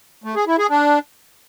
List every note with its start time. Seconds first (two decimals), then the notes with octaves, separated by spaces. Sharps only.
0.24 A3
0.35 G#4
0.47 E4
0.58 G#4
0.70 D4